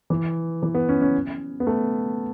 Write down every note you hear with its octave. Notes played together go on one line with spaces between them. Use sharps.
E3
E3
B3
C#4
C#4
B3
A3